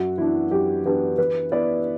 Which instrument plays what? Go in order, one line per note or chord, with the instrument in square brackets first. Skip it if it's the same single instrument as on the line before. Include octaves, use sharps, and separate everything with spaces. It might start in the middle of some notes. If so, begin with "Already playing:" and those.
Already playing: [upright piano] F#2 [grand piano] F#4
[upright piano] E3 B3 D4 [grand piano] E4
[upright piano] F#2 [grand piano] G4
[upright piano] E3 B3 D4 [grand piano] G4
[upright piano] E3 [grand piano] B4
[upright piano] B3 E4 [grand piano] D5